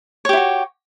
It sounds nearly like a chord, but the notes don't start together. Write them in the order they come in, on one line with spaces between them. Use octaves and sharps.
C#5 G4 E4 F#4